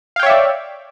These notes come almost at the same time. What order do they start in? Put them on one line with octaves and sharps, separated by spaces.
F5 G5 C#5 E5 D5